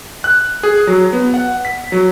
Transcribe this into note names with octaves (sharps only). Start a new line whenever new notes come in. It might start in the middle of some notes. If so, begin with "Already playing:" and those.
F#6
G#4
F#3
B3
F#5
B6
F#3